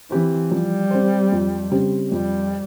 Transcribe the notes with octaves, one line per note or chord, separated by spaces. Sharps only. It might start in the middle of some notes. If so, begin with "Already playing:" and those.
E3 C4 G4 C5
F3 G3
C4 G4 C5
F2
C#3 G3 C4 G4
F2 G3